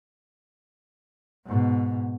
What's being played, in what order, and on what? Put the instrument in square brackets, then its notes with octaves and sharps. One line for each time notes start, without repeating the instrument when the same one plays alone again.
[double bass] G#2 B2